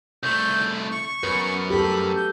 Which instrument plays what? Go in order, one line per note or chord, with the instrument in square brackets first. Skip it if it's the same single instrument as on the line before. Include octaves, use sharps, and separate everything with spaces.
[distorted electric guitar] C2 A3 [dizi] G6
[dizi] C#6
[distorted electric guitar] F#2 [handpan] B4
[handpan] G4 A4 [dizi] B5
[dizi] G6